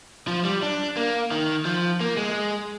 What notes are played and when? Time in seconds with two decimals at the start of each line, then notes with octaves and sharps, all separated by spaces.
0.28 F3
0.45 G3
0.62 D4
0.97 A#3
1.31 D#3
1.65 F3
2.00 A#3
2.17 G#3